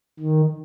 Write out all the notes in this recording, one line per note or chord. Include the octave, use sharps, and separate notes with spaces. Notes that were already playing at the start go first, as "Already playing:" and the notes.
D#3